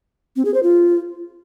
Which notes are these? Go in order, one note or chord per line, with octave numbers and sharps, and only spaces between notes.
C4
G#4
C5
F4